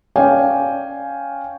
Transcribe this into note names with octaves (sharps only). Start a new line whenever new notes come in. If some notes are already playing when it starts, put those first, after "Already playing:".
C#4 C#5 D5 F5 G5 G#5